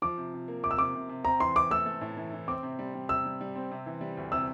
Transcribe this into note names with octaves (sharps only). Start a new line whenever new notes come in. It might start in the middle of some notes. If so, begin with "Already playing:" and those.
F3 D6
C3
C3
A#3
C3 D6
E6
C3 D6
C3
C3
C4 A#5
E3 C6
E3 D6
A3 E6
A3
A2
E3
E3
C4 D6
C3
G3
G3
C3 E6
G3
G3
C4
C3
E3
G3
D2
C3 E6